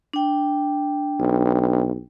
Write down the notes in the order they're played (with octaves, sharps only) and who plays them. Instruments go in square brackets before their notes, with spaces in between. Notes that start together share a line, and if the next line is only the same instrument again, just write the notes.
[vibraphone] D4 G5
[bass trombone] B1